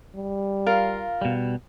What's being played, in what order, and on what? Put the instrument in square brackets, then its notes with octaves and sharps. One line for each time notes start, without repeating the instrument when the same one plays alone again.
[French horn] G3
[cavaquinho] F4 A#4 F5
[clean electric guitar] B2 G3